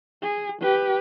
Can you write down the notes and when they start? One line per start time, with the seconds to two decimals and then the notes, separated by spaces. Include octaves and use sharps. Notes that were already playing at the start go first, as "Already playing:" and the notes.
0.22 G#4
0.62 G4 B4